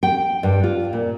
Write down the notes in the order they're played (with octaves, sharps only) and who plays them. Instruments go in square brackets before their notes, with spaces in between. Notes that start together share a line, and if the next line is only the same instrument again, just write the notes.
[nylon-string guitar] G5
G2
F4
A#2